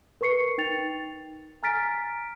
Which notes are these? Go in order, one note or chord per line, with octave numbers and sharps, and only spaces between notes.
A#4 B4 C#6 C7 C#7
D#4 G5 A6 F7
G#5 A#5 F6 A6 B6 D7